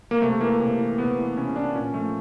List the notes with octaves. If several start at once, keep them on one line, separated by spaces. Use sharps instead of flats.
A#3
C3 A3
E3 A#3
C3
E3
C3 B3
E3
C3 C#4
E3 D4
A#2 C#4
F3 A3